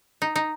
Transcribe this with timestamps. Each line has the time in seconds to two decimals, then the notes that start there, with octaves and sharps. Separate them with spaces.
0.22 D#4
0.36 D#4